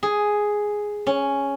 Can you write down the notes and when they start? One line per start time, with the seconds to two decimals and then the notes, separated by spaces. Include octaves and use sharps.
0.03 G#4
1.07 C#4